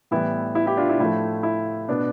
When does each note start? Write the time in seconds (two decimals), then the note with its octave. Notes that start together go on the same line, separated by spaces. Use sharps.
0.11 A2 E3 G3 B3 E4
0.55 E4
0.66 E4 G4
0.77 D4 F4
0.89 E4
1.00 A2 F3 A3 E4
1.43 E4
1.89 B2 B3 D4